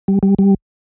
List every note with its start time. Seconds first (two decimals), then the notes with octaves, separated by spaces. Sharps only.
0.08 G3
0.23 G3
0.39 G3